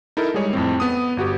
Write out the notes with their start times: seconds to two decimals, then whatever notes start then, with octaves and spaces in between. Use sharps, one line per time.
0.17 D#4 E4 A4 A#4
0.34 G3 G#3 G#4 C#5 D#5
0.53 F2 A2 C4
0.80 B3 D#6
1.17 G1 F#4 G4